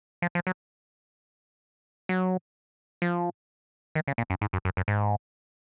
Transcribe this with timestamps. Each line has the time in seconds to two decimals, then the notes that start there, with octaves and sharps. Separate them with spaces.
0.22 F3
0.35 F3
0.47 F#3
2.09 F#3
3.02 F3
3.95 D#3
4.08 C#3
4.18 A#2
4.30 F#2
4.41 G#2
4.53 F#2
4.65 F#2
4.77 F#2
4.88 G#2